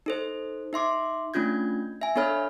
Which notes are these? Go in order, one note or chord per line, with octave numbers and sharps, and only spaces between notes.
D#4 A4 C5
D#4 E5 C6 D6
A3 C#4 D4 F4 G6 G#6
E5 G#5
B3 D4 A4 C#5 B5 F6